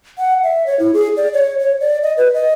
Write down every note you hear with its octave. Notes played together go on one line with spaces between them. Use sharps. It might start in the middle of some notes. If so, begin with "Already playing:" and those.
F#5
E5
C#5
E4
G#4
D5
C#5
C#5
D5
D#5
B4
D#5